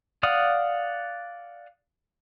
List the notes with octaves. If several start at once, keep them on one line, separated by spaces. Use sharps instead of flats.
D5 F5 F#5 D#6